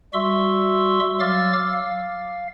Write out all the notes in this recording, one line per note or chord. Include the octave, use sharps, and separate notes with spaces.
G3 F#4 E5 C6 C#6 E6
F#3 F5 D6 E6 F6 A6
F5